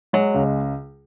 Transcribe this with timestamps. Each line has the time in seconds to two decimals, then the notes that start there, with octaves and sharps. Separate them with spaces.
0.13 F#3 G#3
0.34 C#2